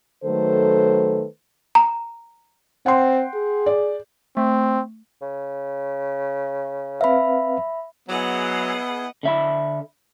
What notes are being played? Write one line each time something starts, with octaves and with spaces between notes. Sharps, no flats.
D#3 F#3 A3 A4 B4 C5
A#5
C4 F#5 G5 C6
G#4
D5
A3 C4
C#3
C4 B4 E5 F5 B5
F#3 B3 E4 G#4 D#5 F#5
D3 E5 B5